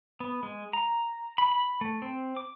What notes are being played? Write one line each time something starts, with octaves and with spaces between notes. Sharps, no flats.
B3
G#3
A#5
B5
B5
A3
C4
D6